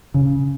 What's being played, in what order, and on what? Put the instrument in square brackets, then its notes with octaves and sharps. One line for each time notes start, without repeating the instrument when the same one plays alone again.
[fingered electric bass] C#3